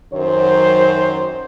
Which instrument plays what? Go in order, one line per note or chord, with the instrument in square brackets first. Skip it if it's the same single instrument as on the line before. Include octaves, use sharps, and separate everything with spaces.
[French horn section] F#2 D#3 F#3 C5